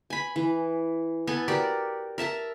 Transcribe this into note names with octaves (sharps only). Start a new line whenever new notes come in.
G#5 B5
E3
B3 A4 G#5
F#4 G4 A#4 D5
A#4 E5 A5 A#5